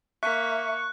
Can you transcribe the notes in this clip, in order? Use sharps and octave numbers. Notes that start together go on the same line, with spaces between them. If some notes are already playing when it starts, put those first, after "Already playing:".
A#3 E5 C#6 F#6